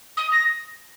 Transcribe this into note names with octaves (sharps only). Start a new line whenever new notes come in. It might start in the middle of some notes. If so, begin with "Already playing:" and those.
D#6
A#6